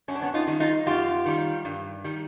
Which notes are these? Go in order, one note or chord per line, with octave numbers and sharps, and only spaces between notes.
F#2 C#4
D4
B3 C#4
D#4 F4
D#3 G3
D#4 F4
F#2 F4 G4
D#3 G3
G2
D#3 G3